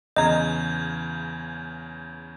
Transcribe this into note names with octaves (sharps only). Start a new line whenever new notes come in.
E2 C#3 D#5 A#5 G6 G#6